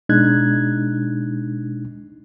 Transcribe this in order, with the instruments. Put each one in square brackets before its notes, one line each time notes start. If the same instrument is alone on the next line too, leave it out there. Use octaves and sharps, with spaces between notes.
[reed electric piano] B2 G#3 D4 D#4 F#6 G#6